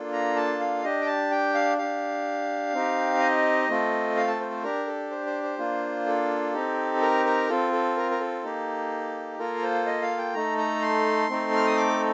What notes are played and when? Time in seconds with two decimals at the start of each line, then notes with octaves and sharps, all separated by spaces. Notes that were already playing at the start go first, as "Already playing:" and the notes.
Already playing: A#3 D4 F4 A4
0.12 A#5
0.36 A5
0.60 F5
0.84 D4 G4 D#5
1.01 G5
1.06 A5
1.31 G5
1.54 F5
1.78 D4 G4 F5
2.74 C4 D#4 G4
3.21 D#5
3.69 A3 C4 F4 A4
4.17 F5
4.28 A5
4.40 C5
4.51 C5
4.63 D4 G4 A#4
4.87 A4
5.11 C5
5.26 C5
5.43 C5
5.58 A#3 D4 F4
6.06 A4
6.54 C4 D#4 G4
7.01 A#4
7.26 A#4
7.49 C4 F4 A4
7.72 A4
7.97 A#4
8.11 A#4
8.20 A4
8.44 A#3 D#4 G4
9.39 A#3 F4 A4 A#4
9.63 C5
9.86 D#5
10.02 F5
10.18 G5
10.34 A3 D#4 A4 A#5
10.58 A#5
10.82 C6
11.29 A3 C4 D#4 A4
11.56 F6
11.67 D#6
11.77 D6